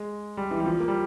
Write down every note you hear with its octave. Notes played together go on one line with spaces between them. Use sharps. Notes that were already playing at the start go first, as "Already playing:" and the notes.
Already playing: G#3
G3
E3
G3
F3
A#3
G3